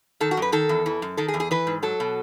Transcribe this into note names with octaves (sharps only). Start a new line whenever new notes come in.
D#3 A4
F#4
F#2 B4
D#3 A4
E2
E3
F#2
D#3 A4
G#4
E2
G#4
E3 B4
G#2
F#3 A4
B2